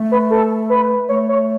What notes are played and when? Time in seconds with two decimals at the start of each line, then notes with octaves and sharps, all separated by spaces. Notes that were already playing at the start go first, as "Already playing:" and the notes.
Already playing: A3
0.12 B4
0.31 A4
0.70 B4
1.09 A3 C#5
1.29 C#5